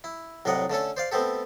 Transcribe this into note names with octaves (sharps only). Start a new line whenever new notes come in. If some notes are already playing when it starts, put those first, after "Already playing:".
E4
C2 A2 F#3 D5 D#5 F#5
D3 A3 C#4 A4
C5 D5 F5
A3 B3 C4 G4 A4